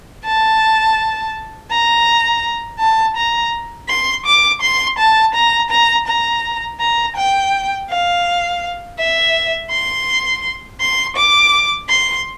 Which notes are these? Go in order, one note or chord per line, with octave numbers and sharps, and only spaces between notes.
A5
A#5
A5
A#5
C6
D6
C6
A5
A#5
A#5
A#5
A#5
G5
F5
E5
C6
C6
D6
C6